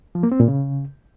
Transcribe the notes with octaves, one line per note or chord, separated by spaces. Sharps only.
F3
A#3
C4
A#2
C#3